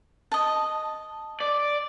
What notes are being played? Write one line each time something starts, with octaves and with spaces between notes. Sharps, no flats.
D#5 A5
D5